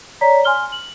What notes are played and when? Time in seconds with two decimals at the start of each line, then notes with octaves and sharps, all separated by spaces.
0.21 C#5 D5 A#5 B6
0.44 G#5 C6 F6 G7
0.72 F#7